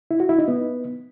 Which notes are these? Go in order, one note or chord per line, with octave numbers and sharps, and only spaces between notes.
E4
F#4
E4
D#4
B3